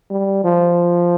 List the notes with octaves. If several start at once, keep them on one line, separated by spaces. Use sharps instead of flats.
G3
F3